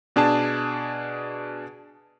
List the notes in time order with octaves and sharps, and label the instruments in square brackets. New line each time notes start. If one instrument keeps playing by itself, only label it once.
[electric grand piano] B2 D4 G#4 A5